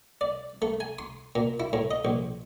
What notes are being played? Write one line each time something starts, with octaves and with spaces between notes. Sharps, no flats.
D5
A3
G#5
C6
A#2
E4
A2
D#5
A#1